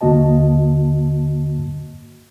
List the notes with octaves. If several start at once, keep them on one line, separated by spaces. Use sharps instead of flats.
D#2 D3 A#3 F#4 D#5 A5